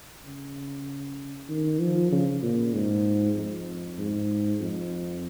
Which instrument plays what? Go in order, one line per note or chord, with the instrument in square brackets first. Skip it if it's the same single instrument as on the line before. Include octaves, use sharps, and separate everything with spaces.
[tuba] C#3
D#3
F3
C#3
A#2
G#2
F2
G#2
F2